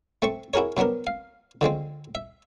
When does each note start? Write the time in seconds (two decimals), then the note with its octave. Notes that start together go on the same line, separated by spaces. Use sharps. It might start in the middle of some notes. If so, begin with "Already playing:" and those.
0.22 A3 C4 C#6
0.54 E4 F#4 G#4 A#4 C#5
0.77 C3 F#3 B3 D4 A#4
1.07 F5
1.61 D3 F3 G#3 C4
2.15 E5